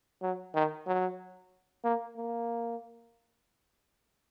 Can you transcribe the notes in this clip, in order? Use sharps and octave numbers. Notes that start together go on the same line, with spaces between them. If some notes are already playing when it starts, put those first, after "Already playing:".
F#3
D#3
F#3
A#3
A#3